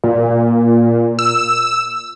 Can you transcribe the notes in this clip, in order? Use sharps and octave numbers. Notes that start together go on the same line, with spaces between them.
A#2
E6